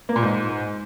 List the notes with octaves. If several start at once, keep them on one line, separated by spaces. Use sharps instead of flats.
A#3
A#2
G#2